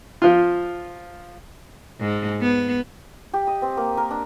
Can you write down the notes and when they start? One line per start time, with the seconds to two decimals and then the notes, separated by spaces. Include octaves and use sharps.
0.22 F3 F4
2.00 G#2
2.41 B3
3.34 G4
3.47 D#5
3.62 C4
3.77 A#3
3.97 A#4
4.11 D4